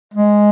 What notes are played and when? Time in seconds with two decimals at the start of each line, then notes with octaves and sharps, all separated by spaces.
0.14 G#3